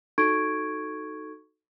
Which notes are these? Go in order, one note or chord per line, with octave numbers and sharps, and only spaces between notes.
D#4 F#4 A4 C#6 G#6 D7